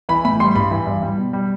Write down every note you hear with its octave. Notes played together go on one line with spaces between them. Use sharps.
E3 B5
A2 B5
G3 C6
G2 B5
E3
G2
G3
B2
G3